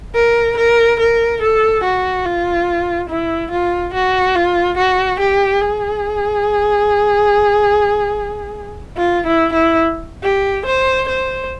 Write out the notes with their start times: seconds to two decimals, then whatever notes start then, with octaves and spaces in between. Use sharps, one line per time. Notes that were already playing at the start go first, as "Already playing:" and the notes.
0.15 A#4
0.57 A#4
1.00 A#4
1.41 A4
1.84 F#4
2.25 F4
3.09 E4
3.51 F4
3.94 F#4
4.35 F4
4.77 F#4
5.20 G4
5.61 G#4
8.97 F4
9.26 E4
9.53 E4
10.23 G4
10.66 C5
11.08 C5